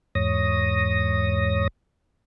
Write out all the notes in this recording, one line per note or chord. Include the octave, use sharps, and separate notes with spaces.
E2 G#2 C#5 D#6 A#6